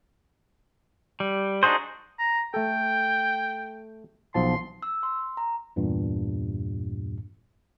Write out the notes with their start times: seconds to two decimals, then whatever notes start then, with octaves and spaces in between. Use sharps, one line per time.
1.20 G3
1.63 D4 D#4 F#4 G#4 C5
2.19 A#5
2.54 A3 A4 G5
4.34 B1 F3 A5 C6
4.83 E6
5.03 C6
5.37 A#5
5.76 E2 G2 A#2